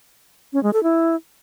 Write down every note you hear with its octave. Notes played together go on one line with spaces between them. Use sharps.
C#4
G#3
A4
E4